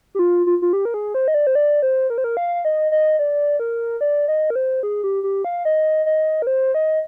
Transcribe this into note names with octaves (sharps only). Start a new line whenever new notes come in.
G4
F4
F4
F4
G4
A#4
G#4
C5
D#5
D5
C5
D5
C5
A#4
C5
A#4
F5
D#5
D#5
D5
A#4
D5
D#5
A#4
C5
G#4
G4
G4
F5
D#5
D#5
A#4
C5
D#5